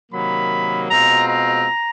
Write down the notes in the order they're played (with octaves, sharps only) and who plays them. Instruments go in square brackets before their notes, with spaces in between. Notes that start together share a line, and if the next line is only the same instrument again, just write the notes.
[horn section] C3 D#3 F#3 A#3 B5
B2 G#3 C4 F4 A#5
A#5